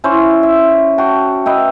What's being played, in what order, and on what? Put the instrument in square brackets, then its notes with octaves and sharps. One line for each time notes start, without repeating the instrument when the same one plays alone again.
[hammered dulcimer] C#4 E4 C5
E5
F#4 G5 A5
B4 D#5 E5 G5